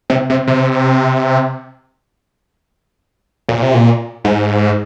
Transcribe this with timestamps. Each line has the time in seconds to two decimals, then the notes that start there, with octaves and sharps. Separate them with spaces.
0.10 C3
0.30 C3
0.47 C3
3.49 A#2
3.62 C3
3.74 A#2
4.24 G#2